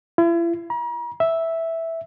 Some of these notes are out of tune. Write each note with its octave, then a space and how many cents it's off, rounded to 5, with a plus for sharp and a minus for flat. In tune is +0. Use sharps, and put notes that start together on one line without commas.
E4 +40
A#5 +40
E5 -5